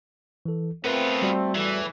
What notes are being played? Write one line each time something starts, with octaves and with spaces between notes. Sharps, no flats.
E3 A4
A3 B3 C4 F4 A#4 B4 F#6
G3 F#4 D5
E2 A2 E3